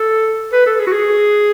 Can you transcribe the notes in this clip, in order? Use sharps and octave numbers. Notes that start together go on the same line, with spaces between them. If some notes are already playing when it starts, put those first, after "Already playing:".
Already playing: A4
B4
A4
G#4
F#4
G#4